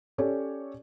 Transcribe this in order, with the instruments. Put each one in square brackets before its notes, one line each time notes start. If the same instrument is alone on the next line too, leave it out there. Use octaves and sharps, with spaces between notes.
[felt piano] C#4 G4 A4 C#5 D5